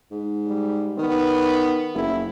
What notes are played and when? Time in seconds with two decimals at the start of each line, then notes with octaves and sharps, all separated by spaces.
0.11 G#2
0.46 G3
0.98 D#3 B3
1.95 F#1 E4